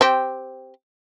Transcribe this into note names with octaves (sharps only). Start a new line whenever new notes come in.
C4 G4